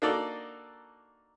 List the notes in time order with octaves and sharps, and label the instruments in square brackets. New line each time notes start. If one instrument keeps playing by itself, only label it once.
[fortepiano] A#3 D4 D#4 F#4 A4 D5